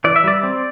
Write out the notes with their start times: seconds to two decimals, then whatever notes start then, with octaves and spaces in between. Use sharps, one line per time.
0.04 E3 D5
0.16 E5
0.24 G3 D5
0.43 C4